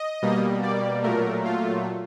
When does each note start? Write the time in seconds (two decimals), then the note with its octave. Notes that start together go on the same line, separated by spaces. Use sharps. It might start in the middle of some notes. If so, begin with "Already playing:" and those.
Already playing: D#5
0.22 B2 G3 A#3
0.63 D5
1.03 A#2 F#3 A3 A#4
1.45 F4